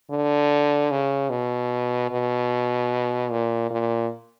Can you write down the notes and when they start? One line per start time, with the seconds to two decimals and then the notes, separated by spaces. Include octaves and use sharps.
0.10 D3
0.91 C#3
1.30 B2
2.11 B2
3.31 A#2
3.71 A#2